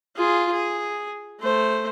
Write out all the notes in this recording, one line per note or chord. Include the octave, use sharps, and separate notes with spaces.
F4 G#4
G#4
A3 C5